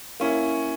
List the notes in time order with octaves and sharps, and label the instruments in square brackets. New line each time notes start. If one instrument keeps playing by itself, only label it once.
[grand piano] A#3 C#4 E4